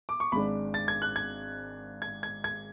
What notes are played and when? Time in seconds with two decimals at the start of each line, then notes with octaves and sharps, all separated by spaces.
0.09 D6
0.20 C#6
0.32 G#1 G#2 G#3 D4 B5
0.74 A6
0.88 G#6
1.02 F#6
1.16 G#6
2.02 G#6
2.23 G#6
2.44 G#6